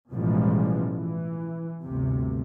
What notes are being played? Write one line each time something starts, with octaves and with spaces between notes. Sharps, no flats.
A1 B2 E3 F3 G3 G#3
E3
G1 D2 C3